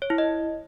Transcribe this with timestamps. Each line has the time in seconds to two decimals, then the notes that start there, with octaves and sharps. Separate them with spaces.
0.02 C#5
0.10 E4
0.18 D#5